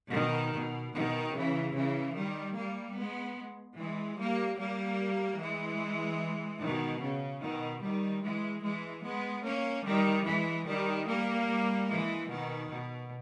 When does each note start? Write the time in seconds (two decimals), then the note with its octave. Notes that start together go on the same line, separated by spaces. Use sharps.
0.13 B2 D#3
0.54 B2
0.94 B2 D#3
1.35 C#3 E3
1.75 C#3 E3
2.16 D#3 G3
2.56 G3 A#3
2.97 G#3 B3
3.78 E3 G#3
4.19 G3 A#3
4.58 G3 A#3
5.40 E3 G#3
6.62 B2 D#3
7.01 C#3
7.42 B2 D#3
7.83 D#3 G3
8.23 E3 G#3
8.64 E3 G#3
9.04 G#3 B3
9.45 A#3 C#4
9.86 D#3 G3
10.26 E3 G#3
10.66 D#3 G3
11.07 G3 A#3
11.87 E3 G#3
12.29 B2 D#3
12.70 B2